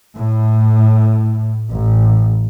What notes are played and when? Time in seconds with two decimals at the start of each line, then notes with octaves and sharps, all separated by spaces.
0.17 A2
1.70 A1